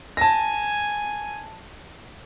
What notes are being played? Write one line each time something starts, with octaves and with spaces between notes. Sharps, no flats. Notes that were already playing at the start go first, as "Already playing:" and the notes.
G#5 A5 A#6